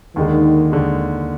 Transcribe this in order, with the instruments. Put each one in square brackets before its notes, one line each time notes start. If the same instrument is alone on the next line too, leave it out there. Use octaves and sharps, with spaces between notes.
[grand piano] D#2 D3 G#3 [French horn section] D#3
[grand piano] D#2 D3 G#3